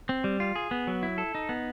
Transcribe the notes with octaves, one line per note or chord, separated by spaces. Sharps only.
C4
G3
F4
G#4
B3
F#3
E4
A4
D#4
B3